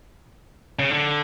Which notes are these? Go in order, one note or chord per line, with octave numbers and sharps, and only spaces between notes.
C#3
D3